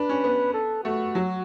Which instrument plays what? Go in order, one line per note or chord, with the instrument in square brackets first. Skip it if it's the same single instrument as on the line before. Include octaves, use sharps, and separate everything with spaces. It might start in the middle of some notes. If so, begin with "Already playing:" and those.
Already playing: [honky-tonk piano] D4 [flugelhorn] B4
[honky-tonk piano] C#4
B3
[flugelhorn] A4
[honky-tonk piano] A3 [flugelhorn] F#4
[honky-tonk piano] F#3